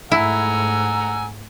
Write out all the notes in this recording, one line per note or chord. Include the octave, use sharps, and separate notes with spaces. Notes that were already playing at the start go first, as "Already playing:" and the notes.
G#2 A3 E4 F#5 G#5 A#5 E6